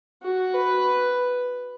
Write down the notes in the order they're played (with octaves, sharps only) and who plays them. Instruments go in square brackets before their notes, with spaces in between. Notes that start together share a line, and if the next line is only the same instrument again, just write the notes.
[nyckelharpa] F#4
B4